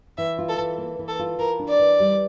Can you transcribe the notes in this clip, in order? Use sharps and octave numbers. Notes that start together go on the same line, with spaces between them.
E3 E5
F4
A4
E3
A#3
E3
A4
F4
E3 A#4
D4
D5
E3
G3